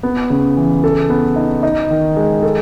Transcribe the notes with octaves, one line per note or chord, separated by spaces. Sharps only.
B3
C#3
E3
A4
B3
D#4
D#4
D#3
G#3
A4